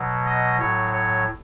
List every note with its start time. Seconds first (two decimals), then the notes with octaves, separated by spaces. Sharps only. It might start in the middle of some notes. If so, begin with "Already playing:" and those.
Already playing: B2 F#3
0.26 D#5
0.59 A2 F#3 C#5
0.93 C#5